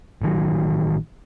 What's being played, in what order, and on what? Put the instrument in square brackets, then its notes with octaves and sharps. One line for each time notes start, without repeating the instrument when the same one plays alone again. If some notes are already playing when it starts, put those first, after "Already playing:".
[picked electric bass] A1 D#3 F#3